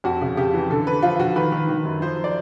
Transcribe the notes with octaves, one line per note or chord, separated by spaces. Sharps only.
F2 F#4
C#3
C#3 G4
E3
D3 A4
D3 B4
F3 F4
D3 F#4
D#3 B4
D#3
D#3
F#2
F3 C5
D5